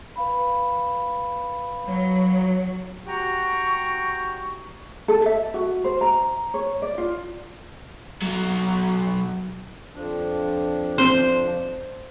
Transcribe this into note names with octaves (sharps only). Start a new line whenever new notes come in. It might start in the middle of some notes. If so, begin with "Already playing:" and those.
B4 F5 B5
F#3
F#4 G4 F#5 G5 A#5 C#6
A4
E5
F#4
C5
A#5
C#5
D5
F4
B1 F#3
F2 F3 D4
C4 C5